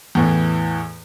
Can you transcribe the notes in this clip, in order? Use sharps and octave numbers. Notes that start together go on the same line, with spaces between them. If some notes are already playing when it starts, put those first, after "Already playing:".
E2 A2 E3